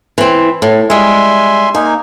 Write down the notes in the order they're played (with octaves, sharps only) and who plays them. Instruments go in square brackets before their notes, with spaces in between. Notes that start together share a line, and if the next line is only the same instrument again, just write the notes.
[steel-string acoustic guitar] E3 C4
A2
[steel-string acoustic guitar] G3 G#3 [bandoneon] E5 G#5 C6
[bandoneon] A#3 D#4 [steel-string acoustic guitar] G#5